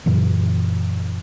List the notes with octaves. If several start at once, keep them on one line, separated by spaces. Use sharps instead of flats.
F#2 A#2 C#3 E3